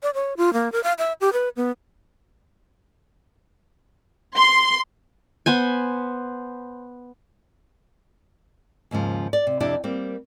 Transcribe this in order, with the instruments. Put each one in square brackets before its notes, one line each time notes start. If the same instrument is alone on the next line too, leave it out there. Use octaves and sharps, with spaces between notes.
[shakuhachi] D5
C#5
F4
A#3
A#4
F5
E5
G4
B4
B3
[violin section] C6
[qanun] B3 C5 G#5
[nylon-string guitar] D#2 G#2 C#3 F3
D5
C3
F2 C3 D4 E4 G4 D5
G3 A#3 C4